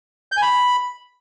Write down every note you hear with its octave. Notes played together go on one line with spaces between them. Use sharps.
G6
G#5
B5